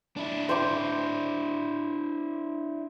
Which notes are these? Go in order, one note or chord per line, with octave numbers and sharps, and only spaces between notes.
D4 E4
C5 C#6 D6